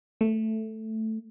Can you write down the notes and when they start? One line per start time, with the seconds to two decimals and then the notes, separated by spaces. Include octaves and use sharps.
0.21 A3